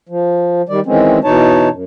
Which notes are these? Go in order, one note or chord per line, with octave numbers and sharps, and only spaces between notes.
F3
D#3 G3 D5
D#3 E3 G#3 C4 C#4
B2 E3 D#4 C#5 A5
F#2